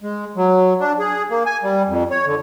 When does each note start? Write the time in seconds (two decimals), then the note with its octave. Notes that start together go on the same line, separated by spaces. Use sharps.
0.01 G#3
0.36 F#3
0.80 D4
0.99 G#4
1.30 A#3
1.46 G#5
1.63 G3
1.88 F2
2.11 C#5
2.26 D3